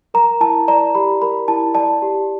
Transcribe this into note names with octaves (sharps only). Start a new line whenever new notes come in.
A#4 A#5
E4 A5
D5 A#5
G4 B5
A#4 B5
E4 A5
D5 A5
G4